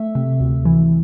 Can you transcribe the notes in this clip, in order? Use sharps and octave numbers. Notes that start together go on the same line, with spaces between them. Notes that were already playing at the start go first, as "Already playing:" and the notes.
Already playing: A3 E5
C3
D2
E3